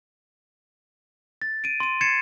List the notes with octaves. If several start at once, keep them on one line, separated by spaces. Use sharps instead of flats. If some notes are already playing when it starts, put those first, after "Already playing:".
A6
D7 D#7
C6 D#7
G#6 A6 C7 C#7 E7